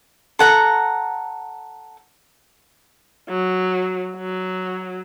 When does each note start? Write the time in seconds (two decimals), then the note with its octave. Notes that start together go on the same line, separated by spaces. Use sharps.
0.39 A4 F#5 A#5
3.30 F#3
4.16 F#3